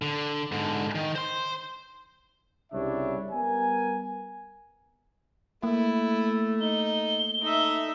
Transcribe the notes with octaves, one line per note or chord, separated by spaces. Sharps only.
D3
G#2 D3
D#3
C5 C6
C2 C#3 G3 D4 C#5 E5
G3 B3 A#4 G#5
A3 A#3 E4
D#4 G7
A3 D#4 E5